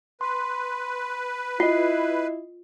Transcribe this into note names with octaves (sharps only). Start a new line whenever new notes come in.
B4 C6
E4 F4 D#5 C7